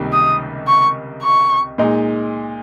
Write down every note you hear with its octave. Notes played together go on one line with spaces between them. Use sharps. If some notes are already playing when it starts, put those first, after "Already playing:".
Already playing: C#2 C3 D#3 G3 A#3
D#6
C#6
C#6
A#2 G#3 D#4